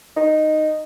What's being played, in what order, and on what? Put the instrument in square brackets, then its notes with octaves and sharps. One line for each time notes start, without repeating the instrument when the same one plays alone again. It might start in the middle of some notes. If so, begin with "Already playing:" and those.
[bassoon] D#4